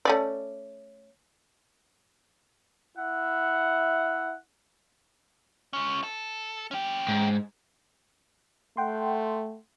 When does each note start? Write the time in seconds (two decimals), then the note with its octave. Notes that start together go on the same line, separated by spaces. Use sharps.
0.05 A3 C#4 D5
2.97 E4 E5 F#5
5.73 G#3 C#4
6.03 A4
6.71 C#4 G4
7.08 G#2
8.77 A3 F#5 G5 C6